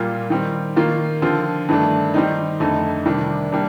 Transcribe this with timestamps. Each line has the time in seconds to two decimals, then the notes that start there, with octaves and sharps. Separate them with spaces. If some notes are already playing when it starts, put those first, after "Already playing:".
Already playing: A#2 G3 A#3 F4
0.30 D#3 G3 C4
0.76 D#3 A#3 F4
1.22 D3 F3 C4 F4
1.69 G2 D#3 A3 D4
2.14 D#3 G3 C4 D#4
2.60 F2 D3 A3 D#4
3.06 C3 D#3 G3 D4
3.52 G3 A#3 D4